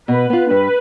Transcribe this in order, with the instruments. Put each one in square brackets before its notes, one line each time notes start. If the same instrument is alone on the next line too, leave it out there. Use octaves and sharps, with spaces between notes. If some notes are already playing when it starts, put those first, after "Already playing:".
[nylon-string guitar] B2 [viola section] B4
[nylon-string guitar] B3 F4
[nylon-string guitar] G2 [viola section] B4